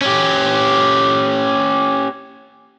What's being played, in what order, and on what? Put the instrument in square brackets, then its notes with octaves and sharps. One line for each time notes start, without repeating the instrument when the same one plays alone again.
[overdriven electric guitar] C#4 G4